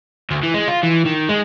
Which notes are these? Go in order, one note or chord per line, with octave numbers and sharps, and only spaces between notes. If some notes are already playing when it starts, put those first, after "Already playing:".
D2
E3
G#3
F4
E3
D#3
G#3